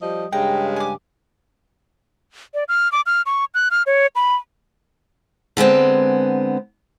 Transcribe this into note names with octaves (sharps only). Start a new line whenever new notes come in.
F3 G3 D#5
G2 C#3 G#3 G5 A#5
G#5 D6
D5
F6
D6
F6
C#6
F#6
F6
C#5
B5
D3 G#3 B3 C4